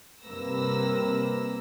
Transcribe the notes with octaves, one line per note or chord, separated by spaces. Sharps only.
G2 C3 A#3 B4 E6 A#6